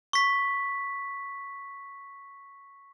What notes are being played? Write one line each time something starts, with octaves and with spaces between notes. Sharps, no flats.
C#6 B6